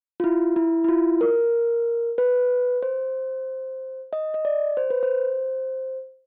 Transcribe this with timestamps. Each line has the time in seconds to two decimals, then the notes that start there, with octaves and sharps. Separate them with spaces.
0.20 F4
0.24 E4
0.56 E4
0.84 E4
0.89 F4
1.21 A#4
2.18 B4
2.83 C5
4.13 D#5
4.34 D#5
4.45 D5
4.77 C5
4.90 B4
5.03 C5